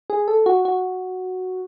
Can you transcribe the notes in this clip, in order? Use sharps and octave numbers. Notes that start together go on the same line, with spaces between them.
G#4
A4
F#4
F#4